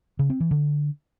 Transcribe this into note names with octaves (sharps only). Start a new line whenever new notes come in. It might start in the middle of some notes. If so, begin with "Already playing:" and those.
C#3
C4
E3
D3